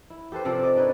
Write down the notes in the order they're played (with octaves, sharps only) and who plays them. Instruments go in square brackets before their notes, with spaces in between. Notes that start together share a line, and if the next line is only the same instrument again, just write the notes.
[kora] E4
G4 A4 B4 C5
C3 F3 A4 D5
D5 D#5
D4 D#4 B4 C#5